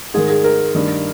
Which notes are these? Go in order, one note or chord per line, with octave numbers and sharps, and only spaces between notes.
G#2 D#3 G#4
G#4
A#4
G2 D#3